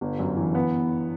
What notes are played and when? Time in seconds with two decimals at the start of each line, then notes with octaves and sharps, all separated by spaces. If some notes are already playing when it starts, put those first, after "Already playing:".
0.01 G1
0.19 F#2
0.37 E3
0.55 B3